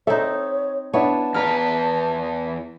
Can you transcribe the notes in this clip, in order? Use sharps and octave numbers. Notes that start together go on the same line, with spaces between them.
C4 D#4 A4 C#5 E5
B3 D4 E4 C#5 A5
E2 B4 A#5 F6